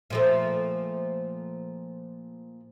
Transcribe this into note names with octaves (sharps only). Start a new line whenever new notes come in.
A#2 F3 A3